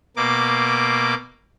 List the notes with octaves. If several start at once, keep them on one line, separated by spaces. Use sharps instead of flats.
B2 A#3 D6